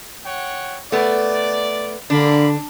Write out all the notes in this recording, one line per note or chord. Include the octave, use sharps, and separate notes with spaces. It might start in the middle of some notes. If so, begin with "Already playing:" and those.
C#5 F#5 G5
A3 B3 D5
D3 A#3 D4 D5 B5